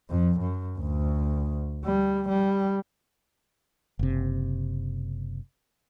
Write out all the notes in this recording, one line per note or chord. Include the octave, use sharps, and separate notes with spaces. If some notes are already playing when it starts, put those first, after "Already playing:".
F2
F#2
D2
G3
G3
F#1 C3